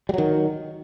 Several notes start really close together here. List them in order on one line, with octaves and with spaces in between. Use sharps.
G3 F#3 D#3